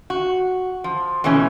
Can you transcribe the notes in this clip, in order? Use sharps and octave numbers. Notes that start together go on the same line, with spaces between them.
F#4
F3
B2 E3 A3 C#4